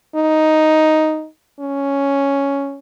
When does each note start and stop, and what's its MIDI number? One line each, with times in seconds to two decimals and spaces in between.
0.16 1.26 63
1.60 2.79 61